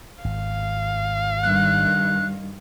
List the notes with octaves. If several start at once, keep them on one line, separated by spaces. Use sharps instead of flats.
G#1 F5
G2 D#3 F#6